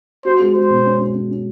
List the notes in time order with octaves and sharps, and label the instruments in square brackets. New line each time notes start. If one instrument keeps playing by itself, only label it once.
[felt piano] F#4 [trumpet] C5
[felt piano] G#3
[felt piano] G#3 [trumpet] C5
[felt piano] B2
C#4
C#4
C#4
C#4